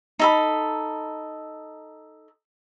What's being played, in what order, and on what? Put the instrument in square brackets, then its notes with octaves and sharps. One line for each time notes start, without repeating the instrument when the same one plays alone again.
[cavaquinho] D#4 A4 B5